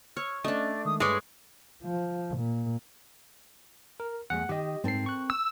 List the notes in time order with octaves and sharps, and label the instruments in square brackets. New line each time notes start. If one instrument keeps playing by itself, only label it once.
[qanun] C#5 [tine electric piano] E6 F6
[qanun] A3 D4 [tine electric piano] C#4 D#5 [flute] D5
[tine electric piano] D#3 G#3 [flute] D#6
[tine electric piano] G2 B4 [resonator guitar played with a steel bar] G#3 [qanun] C#5 D5 [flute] D6
[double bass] F3
A#2
[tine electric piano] A#4
[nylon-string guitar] E2 A3 [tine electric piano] F#5
[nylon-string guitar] D#3 [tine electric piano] G4 D#5
[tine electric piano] G#2 C7 [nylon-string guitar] C4 A4 A#4
[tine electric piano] C#6 F#6
[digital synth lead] E6